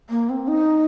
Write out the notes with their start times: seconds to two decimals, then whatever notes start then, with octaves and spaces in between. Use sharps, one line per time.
0.09 A#3
0.29 C4
0.48 D#4